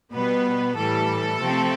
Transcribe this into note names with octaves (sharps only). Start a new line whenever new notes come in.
B2 G3 B3 B4
A2 E3 G3 A4
C3 F3 A3 C4